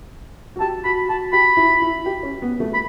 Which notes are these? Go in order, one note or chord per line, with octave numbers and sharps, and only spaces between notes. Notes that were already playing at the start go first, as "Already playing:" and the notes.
F#4
G4 A5
F#4 B5
F#4 A5
G4 B5
E4
E4
G4
C#4
B3
A3
B5